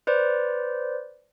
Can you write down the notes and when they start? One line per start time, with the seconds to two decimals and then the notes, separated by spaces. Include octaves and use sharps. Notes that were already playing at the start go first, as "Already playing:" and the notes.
0.07 B4 C5 D5